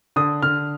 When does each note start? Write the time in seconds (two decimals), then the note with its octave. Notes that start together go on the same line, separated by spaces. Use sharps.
0.16 D3 D#6
0.42 D3 F6